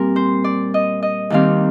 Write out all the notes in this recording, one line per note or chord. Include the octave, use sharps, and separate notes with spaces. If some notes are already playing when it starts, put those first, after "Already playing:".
Already playing: A#2 G3 C4 A#4
C5
D5
D#5
D#5
D#2 D#3 G3 C4 F5